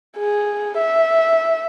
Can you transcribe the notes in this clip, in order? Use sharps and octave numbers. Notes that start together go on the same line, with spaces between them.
G#4
E5